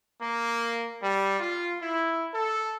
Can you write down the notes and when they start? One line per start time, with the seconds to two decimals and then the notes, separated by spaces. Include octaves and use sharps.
0.21 A#3
1.02 G3
1.39 F4
1.80 E4
2.32 A4